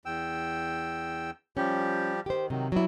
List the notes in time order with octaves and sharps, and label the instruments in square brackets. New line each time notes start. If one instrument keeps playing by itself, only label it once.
[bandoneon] E2 G5 E6
[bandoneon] F3 G3 G4 [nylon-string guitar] C#4
[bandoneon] D#3 [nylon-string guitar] G4 C5
[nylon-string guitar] C3 [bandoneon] D#3 F#3
[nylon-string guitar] F#3 E4 [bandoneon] G3 B3